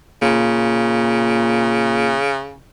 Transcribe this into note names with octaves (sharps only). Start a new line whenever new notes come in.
A#2 C#3